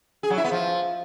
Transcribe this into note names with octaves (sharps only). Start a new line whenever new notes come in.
G#4
F#3
E4
B3
F3